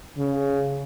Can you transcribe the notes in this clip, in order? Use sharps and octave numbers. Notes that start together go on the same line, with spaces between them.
C#3